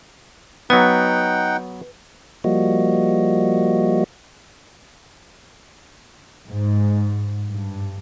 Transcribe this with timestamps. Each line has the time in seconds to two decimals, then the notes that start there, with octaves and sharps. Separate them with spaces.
0.70 F#3 B3 D#4 B4 F#5 G5
2.44 F3 G3 A#3 F#4 D#5
6.47 G#2
7.47 G2